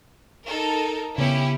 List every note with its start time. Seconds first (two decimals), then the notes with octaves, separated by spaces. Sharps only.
0.47 D#4 A4 A#4
1.18 C#3 B3 C#4 E4 G4